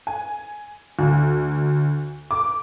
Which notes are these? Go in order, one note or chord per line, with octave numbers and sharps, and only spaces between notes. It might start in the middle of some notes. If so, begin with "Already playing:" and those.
G#5
D2
D6